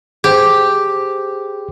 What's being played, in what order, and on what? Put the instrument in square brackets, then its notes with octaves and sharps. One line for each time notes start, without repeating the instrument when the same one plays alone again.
[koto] G4 [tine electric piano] G#4 C5